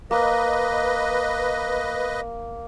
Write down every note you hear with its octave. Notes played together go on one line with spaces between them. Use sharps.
A#3 B4 D#5